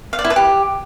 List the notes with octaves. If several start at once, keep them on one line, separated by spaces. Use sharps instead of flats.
F5
D5
E4
B4
G4